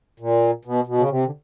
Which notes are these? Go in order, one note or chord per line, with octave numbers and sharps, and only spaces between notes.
A#2
B2
B2
C#3
C3
D3